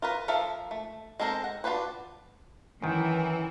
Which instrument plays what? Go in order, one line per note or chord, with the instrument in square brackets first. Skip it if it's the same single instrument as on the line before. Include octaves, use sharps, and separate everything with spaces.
[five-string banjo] F4 A#4 B4
F3 A4 A#4 E5 F5
A3
G#3 C4 A4 A#4 C5
F#5
D4 F4 F#4 B4 C5
[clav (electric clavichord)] F#2 D#3 [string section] E3